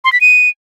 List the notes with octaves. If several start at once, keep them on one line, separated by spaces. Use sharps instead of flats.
C6
B6
D#7